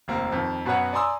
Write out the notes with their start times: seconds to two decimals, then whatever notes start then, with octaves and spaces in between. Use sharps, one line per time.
0.08 F1 D#2 A#3 C4
0.32 F2 D#3
0.65 F#2 B2 F#4 B4 C#5 F#5
0.93 D5 G#5 A#5 C6 D#6 E6